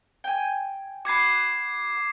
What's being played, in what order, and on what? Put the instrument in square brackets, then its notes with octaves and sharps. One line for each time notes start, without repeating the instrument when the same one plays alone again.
[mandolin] G5 G#5
[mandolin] F#4 B4 [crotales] D6 G#6 C7